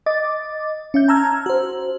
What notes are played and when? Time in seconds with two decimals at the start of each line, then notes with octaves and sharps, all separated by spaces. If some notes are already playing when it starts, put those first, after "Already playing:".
0.06 D#5 D6 A6
0.94 C#4 E5 G6
1.08 A5 A#5 E6 F6 G#6
1.46 F#4 C5